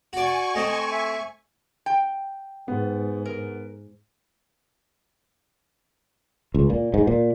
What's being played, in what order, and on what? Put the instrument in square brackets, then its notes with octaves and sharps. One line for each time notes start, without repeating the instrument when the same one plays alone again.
[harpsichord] F#4 D5 [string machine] G#5 C#6
[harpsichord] A3 C4 [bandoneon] D#5
[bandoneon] E5
[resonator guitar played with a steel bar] G5
[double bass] G#2 [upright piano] B3
[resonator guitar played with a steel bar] A#4
[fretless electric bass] C#2
A#2
G#2
A#2